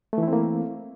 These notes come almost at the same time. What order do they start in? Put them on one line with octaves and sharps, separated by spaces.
A3 E3 E4 C4 A#3